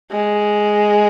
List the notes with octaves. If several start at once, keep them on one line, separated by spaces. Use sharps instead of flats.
G#3